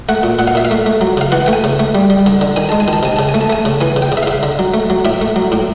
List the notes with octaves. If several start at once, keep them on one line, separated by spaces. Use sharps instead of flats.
A3 F#5
A#2
A#2 F#5
F5
A#2 E5
F5
A3
A3
F#3
C#3 F5
E3 F#5
A3 G5
G#5
C#3
A3
G3
G3
D3
D3
D#3 G#5
G#3 A5
G#5
D#3
A5
C3 G#5
C#3 A5
G#5
A3
A5
A3 G#5
C#3
E3 G#5
C#3
G5
C#3
E5
C#3 F5
D3
F#3
A3
F#3
A2 E5
A3
F#3
A2